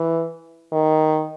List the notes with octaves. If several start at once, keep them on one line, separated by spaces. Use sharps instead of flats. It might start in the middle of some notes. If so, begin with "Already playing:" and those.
Already playing: E3
D#3